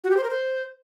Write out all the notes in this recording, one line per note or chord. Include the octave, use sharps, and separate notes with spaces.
F#4
G4
C5
A#4
C5